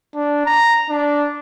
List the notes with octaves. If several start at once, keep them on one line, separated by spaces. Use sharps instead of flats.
D4
A#5
D4